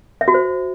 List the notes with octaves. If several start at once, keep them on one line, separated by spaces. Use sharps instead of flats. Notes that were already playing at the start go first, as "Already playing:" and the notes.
E5
F#4
C5